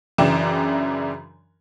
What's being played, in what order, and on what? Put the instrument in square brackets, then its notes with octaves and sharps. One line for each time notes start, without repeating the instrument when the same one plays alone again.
[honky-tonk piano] F#2 C#3 E3 D4 G5 E7